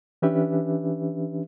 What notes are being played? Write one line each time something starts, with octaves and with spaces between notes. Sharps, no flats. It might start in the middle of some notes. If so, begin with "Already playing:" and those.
E3 C#4 D4 G4 B4 E5